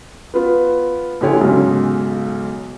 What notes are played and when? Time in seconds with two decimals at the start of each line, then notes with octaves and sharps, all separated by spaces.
0.34 B3 F4 B4
1.21 A#1 D3 E4 G4 C#5 G#5
1.41 B1 G#2 C#3 F#3